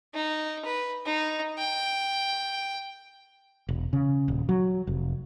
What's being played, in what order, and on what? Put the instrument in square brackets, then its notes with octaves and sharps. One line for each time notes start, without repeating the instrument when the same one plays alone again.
[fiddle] D#4
B4
D#4
G5
[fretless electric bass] E1
C#3
D#1
F#3
F1